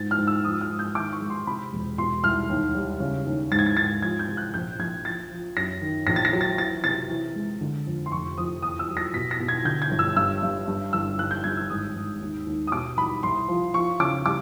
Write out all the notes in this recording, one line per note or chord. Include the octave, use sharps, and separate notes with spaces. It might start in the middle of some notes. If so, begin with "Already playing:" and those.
Already playing: G#2 A6
F6
G#2
E6
F3 D#6
F6
G#2
G6
D#3 D6
C#6
G#3
C6
C3 B5
E1
B2 C6
C2 F6
D#2
G3
C#3
D#2
G#2 A6
G#6
A6
G#2 A6
F3 G#6
G6
C3
F#6
A#1 G6
A#1 G#6
F3 A6
F3
F#2 A#6
D#3
A#1 A#6
A6
A#6
F#3
A6
E3 A6
C3 A6
E3
G#3
D3
F2
C6
F1 C#6
F2 D#6
E2 D#6
E6
F#3
A#6
B2 B6
A#6
B2
G#6
D3 G6
G#6
G1
E6
G2 E6
G2
G2
G1 E6
G2 F#6
G6
G2 G#6
E6
G#1 D#6
G#1
D#2
D#2
D#6
B2 D6
G3 B5
C2 C6
F3
F3 C#6
C#3 D6
G3 D6